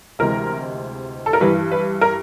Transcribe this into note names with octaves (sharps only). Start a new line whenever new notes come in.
D2 C3 E3 G#3 A#4
A4
A#4
G2 E3 G3 B4
B4
A#4